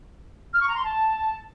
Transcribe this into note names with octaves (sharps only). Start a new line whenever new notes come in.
F6
C#6
A#5
C6
A5